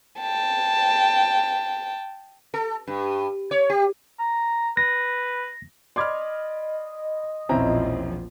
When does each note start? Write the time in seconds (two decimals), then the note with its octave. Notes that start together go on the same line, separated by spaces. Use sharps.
0.21 G5 A5
2.54 A4
2.87 G2
3.51 C#5
3.70 G4
4.19 A#5
4.77 B4 A#6
5.96 D5 D#5 B5 C6 D6 F6 G#6
7.49 E1 A#1 F3 C4 C#4 E4 A#5